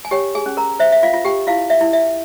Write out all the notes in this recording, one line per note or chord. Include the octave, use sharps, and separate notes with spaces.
G#5
G4 C#5 G5
G#4 G#5
C#4
A#4 A#5
C5 E5
E5
F4 F5
F4
G4 G5
E4 F4 F5
E5
E4
E5